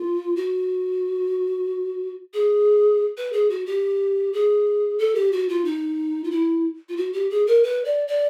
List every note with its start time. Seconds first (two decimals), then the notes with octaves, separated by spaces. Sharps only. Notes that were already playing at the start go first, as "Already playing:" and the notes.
Already playing: F4
0.36 F#4
2.33 G#4
3.17 B4
3.33 G#4
3.50 F#4
3.66 G4
4.33 G#4
4.99 A4
5.15 G4
5.32 F#4
5.49 F4
5.65 D#4
6.24 F4
6.31 E4
6.89 F4
6.97 F#4
7.13 G4
7.30 G#4
7.47 A#4
7.63 B4
7.85 D5
8.08 D5